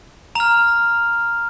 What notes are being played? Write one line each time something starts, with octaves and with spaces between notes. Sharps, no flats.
A#5 F6 F7